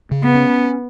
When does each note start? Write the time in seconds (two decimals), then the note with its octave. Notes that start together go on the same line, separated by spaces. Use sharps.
0.11 C#3
0.23 B3
0.35 C#4